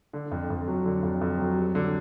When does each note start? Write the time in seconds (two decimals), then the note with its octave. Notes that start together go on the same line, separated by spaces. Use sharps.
0.13 D3
0.31 F2
0.50 F2
0.68 F#3
0.85 D3
1.03 F2
1.21 F2
1.38 F#3
1.56 G3
1.75 D3